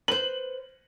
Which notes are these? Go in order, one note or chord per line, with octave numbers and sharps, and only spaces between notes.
B4 C5 F#7